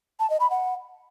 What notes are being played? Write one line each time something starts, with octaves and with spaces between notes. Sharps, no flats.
A5
D#5
B5
F#5